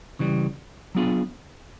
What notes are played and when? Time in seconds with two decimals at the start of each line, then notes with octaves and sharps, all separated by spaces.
0.19 C#3 E3 G3
0.95 F#3 B3 D4 F4 G#4